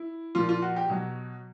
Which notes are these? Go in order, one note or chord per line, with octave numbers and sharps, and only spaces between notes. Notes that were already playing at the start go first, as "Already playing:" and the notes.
Already playing: E4
A#2 F3 F4
F4
F#4
G4
B2 F#3